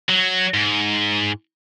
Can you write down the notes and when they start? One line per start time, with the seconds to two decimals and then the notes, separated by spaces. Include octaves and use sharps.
0.09 F#3
0.54 G#2